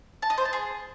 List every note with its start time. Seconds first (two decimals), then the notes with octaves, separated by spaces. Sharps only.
0.22 A5
0.30 D#5
0.38 C5
0.45 A5
0.53 G#4